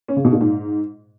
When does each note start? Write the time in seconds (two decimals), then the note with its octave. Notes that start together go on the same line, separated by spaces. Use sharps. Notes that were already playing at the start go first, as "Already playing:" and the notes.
0.08 C#4
0.16 C#3
0.25 B2
0.33 A#2
0.41 G#2